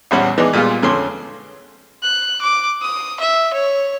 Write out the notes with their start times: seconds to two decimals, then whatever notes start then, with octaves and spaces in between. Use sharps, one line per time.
0.11 A#1 E2 G3 C#4 F#5
0.38 E3 G#3 B3 D4 D#4
0.53 A#2 G3 G#3 B3 F4
0.83 F2 D3 C#4 C6
2.03 F#6
2.41 D6
2.82 D#6
3.20 E5
3.53 C#5